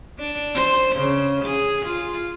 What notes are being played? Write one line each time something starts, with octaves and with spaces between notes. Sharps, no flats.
D4
C5
C#3
G#4
F4